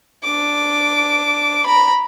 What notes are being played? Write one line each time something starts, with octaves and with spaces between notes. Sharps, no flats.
D4 D6
A#5 B5